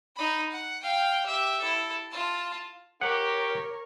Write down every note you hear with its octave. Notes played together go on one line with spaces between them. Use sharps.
D#4 B5
F#5
F5 G5
G4 E5
E4 A4
F4 A5
G4 A#4 C#5 F#5